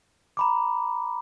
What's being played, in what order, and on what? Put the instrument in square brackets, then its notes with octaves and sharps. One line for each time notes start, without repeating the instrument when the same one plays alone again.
[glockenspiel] A#5 B5 D6